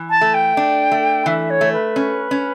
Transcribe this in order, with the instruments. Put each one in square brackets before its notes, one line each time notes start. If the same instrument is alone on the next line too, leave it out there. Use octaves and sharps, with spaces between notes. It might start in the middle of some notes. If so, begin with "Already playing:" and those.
Already playing: [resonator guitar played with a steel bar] E3
[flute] A5
[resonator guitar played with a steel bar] A3
[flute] G5
[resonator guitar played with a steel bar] D4
A3
[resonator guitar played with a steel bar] E3 [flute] E5
[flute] C#5
[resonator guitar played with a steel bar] A3
[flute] B4
[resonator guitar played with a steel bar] C#4
C#4